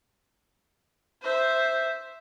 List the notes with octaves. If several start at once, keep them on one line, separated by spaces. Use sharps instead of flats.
C5 E5